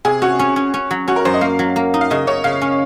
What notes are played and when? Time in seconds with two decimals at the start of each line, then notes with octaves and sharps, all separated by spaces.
0.05 C3 G#4
0.22 C#4 F#4
0.39 C#4
0.56 C#4
0.74 C#4
0.91 F#3
1.08 C#4 F#4
1.16 A#4
1.25 F#2 C5
1.33 D#5
1.41 A#3 F5
1.59 F#3
1.76 A#3
1.94 D#4
2.01 F5
2.10 C#3 D#5
2.27 C#3 C#5
2.44 C#3 F5
2.61 C#4